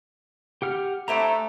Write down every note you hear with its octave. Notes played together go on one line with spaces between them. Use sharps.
G4 F#5 F6
A3 D4 E4 C5 A#5